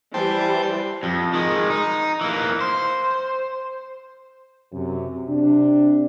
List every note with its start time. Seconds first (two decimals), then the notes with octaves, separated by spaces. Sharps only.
0.14 E3 G3 C5 G5 A5
1.03 F2
1.34 D#3 G#3
1.70 D#4
2.21 E3 A#3
2.60 C5
4.73 F#2 C3
5.28 C3 D4